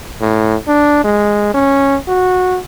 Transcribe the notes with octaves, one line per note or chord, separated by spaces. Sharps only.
A2
D4
G#3
C#4
F#4